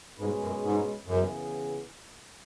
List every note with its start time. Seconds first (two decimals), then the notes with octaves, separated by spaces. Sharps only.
0.18 G#2 B2 G#3 C#4 G#4 B4
0.41 F#2
0.63 G#2
1.06 F#2 C#3 E3 B3 G#4